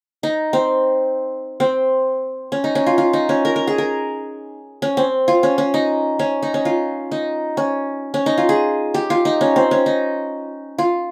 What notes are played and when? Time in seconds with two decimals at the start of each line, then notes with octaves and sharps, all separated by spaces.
0.23 D#4
0.53 C4
1.60 C4
2.52 C#4
2.64 D#4
2.75 C#4
2.86 F4
2.98 F4
3.13 D#4
3.29 C#4
3.45 A#4
3.56 A#4
3.67 G#4
3.78 A#4
4.82 C#4
4.97 C4
5.28 F4
5.43 C#4
5.58 C#4
5.74 D#4
6.19 C#4
6.43 D#4
6.54 C#4
6.65 F4
7.12 D#4
7.57 C#4
8.14 C#4
8.26 D#4
8.38 F4
8.49 G#4
8.94 G4
9.10 F4
9.25 D#4
9.41 C#4
9.56 C4
9.71 C#4
9.86 D#4
10.78 F4